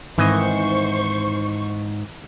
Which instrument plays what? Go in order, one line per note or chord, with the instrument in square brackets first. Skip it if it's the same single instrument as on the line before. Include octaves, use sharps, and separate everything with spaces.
[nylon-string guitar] G#2 [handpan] D#3 C4 [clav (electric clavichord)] E3 D#5 [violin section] C5 C#6